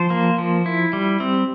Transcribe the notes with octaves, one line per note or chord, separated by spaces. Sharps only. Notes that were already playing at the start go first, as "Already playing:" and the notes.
Already playing: F3 C5
A#3
F3
E4
G3
C4